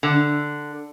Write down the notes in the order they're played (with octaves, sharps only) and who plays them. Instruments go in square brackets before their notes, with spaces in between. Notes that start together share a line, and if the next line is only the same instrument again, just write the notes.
[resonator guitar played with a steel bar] D3